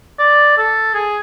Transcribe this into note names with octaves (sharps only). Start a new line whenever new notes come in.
D5
A4
G#4